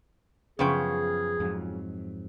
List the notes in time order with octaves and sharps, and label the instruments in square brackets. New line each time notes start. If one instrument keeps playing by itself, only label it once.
[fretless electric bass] F#2 B3 C#4 [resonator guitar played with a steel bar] C#3 F3 G5 [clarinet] G#4
[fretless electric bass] F2 G#2 F#3